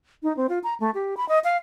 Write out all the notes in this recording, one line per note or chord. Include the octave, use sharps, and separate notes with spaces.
D#4
C4
F4
A#5
A3
G4
B5
D#5
F5